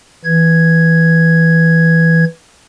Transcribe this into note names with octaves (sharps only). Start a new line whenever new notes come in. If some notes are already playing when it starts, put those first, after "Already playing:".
E3 G#6